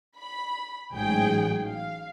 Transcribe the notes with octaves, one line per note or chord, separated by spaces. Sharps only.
B5
A1 G#2 F#3 G#4 G5
F5